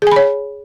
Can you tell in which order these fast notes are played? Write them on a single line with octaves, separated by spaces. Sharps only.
G#4 G#5 B5 C#5